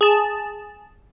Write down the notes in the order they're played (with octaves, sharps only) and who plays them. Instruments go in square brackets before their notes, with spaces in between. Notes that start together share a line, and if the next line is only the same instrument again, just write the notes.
[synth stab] G#4 A5